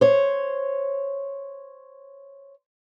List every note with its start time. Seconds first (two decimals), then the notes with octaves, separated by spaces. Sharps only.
0.01 C5 C#5